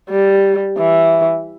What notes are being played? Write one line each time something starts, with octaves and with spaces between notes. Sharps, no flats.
G3
E3